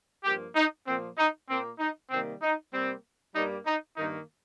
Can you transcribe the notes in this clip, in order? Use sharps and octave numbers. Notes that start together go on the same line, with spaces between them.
G2 F3 A#3 G4
D#4
A#2 F3 A#3 C4
D#4
A#2 A#3 C4
D#4
C3 D#3 G3 A#3 C4
D#4
C3 G3 A#3 C4
G2 G3 A#3 D#4
D#4
G2 D#3 A#3 D#4